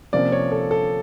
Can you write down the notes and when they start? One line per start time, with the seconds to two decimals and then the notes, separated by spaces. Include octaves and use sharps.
0.13 C3 F3 A#3 C#4 D5
0.32 C#5
0.52 A4
0.71 A4